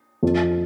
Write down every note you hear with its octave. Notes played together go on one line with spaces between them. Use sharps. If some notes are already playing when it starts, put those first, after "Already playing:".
F2